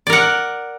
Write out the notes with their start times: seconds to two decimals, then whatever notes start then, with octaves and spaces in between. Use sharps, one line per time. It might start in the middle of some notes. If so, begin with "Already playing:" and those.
0.07 D5
0.10 A#4
0.13 F#5